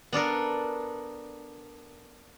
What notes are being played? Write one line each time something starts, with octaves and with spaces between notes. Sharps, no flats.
B3 D4 A4 A#4